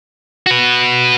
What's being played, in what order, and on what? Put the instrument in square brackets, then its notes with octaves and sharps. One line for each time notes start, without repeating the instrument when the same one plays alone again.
[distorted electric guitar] F#4 B4